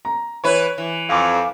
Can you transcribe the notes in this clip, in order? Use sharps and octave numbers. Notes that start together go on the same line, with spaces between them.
A#5
E3 E4 B4 C#5
E3
F2 F5 G#5 D6